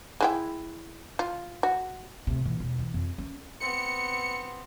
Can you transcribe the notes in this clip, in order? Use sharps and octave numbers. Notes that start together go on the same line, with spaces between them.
G#3 E4 G5
F4
F#4
D2 C3
A#2 E3
E1
D3 E3
F2
C#4
B3 C4 C#7